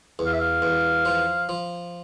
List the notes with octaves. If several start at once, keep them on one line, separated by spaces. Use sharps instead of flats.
E2
F5
E5
F5
E2
F3
F3